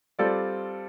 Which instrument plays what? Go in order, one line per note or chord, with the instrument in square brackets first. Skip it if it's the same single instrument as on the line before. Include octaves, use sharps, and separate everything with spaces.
[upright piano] G3 C4 F4 A4 D5